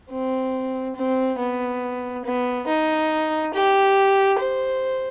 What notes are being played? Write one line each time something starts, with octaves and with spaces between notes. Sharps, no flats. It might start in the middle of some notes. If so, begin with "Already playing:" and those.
C4
C4
B3
B3
D#4
G4
C5